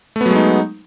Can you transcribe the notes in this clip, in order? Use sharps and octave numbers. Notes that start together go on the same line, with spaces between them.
F#3 G#3 A3 B3 D#4